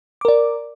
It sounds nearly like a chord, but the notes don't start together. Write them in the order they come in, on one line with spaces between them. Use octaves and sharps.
D6 A#4 D5